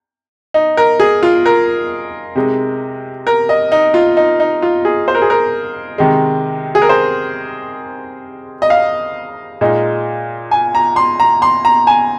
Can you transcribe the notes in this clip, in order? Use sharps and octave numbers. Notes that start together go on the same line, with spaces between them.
D#4
A#4
G#4
F4
A#4
C3 G#3 D#4
A#4
D#5
D#4
F4
D#4
D#4
F4
G#4
C5
A#4
G#4
A#4
C3 D#3 G#3
G#4
A#4
C5
D#5
F5
A#2 G#3 D#4
G#5
A#5
C6
A#5
C6
A#5
G#5